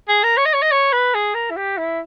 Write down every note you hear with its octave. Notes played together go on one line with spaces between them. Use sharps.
G#4
A#4
C#5
D#5
C#5
D#5
C#5
B4
G#4
A#4
E4
G4
E4